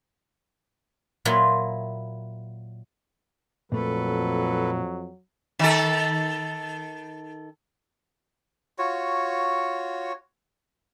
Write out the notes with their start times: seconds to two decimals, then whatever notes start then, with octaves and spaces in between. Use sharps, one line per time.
1.25 A#2 F#3 E4 F4
3.72 F2 A#2 F#3 A3 A#3 A4 B4
5.59 D#3 A4
8.78 F4 F#4 C#5